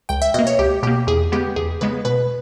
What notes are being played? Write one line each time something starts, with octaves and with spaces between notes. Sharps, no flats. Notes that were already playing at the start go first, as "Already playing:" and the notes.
C#2 G5
E5
B2 A#3 D#5
C#5
C#2 G4
B2 A#3 G4
E2 G#4
C#3 G#3 B3 G4
E2 G#4
C#3 G#3 B3 B4
B2 B4